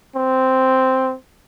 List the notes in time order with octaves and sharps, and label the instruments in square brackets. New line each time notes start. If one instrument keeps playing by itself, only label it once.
[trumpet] C4